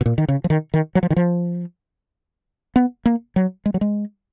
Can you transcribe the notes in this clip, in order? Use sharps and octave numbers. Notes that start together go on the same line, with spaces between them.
B2
A#2
D#3
C#3
F3
D#3
D#3
F#3
F3
D#3
F3
B3
A#3
F#3
G#3
F#3
G#3